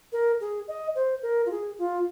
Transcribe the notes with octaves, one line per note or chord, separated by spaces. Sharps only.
A#4
G#4
D#5
C5
A#4
F4
G#4
F4